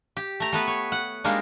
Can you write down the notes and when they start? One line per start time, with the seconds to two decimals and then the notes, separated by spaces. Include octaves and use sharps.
0.17 G4
0.40 A3 A#5
0.53 A3 B3 B4
0.67 C#5
0.92 F#5
1.24 G3 G#3 A#3 D4 D#4